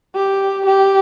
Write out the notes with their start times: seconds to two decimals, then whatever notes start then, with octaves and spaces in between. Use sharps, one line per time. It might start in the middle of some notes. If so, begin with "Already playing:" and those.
0.15 G4
0.66 G4